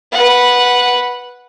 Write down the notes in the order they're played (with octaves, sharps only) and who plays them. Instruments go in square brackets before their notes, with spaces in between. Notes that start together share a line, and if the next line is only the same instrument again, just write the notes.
[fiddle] B4 F#5